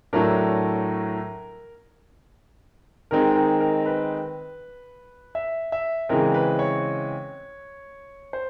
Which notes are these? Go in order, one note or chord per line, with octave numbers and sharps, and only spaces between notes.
A2 F#3 A3 D4 A#4
D#3 G#3 C4 D#4 A#4
A#4
A#4
B4
E5
E5
C#3 E3 G#3 C4 A#4
B4
C#5
C5